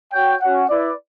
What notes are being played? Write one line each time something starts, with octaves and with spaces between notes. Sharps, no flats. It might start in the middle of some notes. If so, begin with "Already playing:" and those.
F#4 C#5 G5
C#4 F#4 C#5 F#5
E4 B4 D5